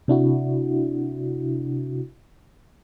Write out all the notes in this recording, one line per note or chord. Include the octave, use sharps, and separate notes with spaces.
C3 D4 E4 F#4